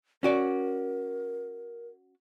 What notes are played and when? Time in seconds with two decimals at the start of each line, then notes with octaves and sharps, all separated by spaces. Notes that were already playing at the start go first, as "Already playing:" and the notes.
0.23 C#4 F#4 A#4 D5